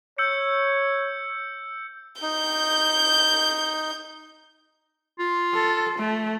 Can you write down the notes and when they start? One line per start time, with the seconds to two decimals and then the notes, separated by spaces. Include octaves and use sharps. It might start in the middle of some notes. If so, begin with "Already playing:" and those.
0.18 C#5 E6 G6 C#7
2.22 D#4 G6
5.19 F4
5.54 A4
5.99 A3